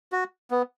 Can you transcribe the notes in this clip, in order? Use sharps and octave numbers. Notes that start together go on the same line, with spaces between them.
F#4
B3